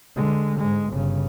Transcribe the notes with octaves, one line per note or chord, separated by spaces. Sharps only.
D3 G#3
G#2 G#3
G1 C#3